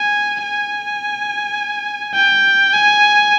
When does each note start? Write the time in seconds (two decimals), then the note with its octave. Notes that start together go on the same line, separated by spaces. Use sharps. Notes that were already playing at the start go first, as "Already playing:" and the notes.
Already playing: G#5
0.43 G#5
2.15 G5
2.73 G#5